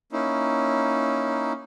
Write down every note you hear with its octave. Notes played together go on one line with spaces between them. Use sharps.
A#3 C#4 D#4 E4